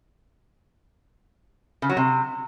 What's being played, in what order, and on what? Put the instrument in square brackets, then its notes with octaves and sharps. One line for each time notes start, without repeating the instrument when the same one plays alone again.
[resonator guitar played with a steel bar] C#3
F#3
C3